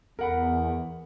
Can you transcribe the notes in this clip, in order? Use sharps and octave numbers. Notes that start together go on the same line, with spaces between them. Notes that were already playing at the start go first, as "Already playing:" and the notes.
E2 A#4 F#5 B5